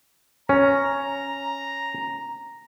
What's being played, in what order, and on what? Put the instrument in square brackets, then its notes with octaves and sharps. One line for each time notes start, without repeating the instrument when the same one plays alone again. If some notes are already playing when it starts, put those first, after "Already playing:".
[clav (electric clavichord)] C#4 [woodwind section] A#5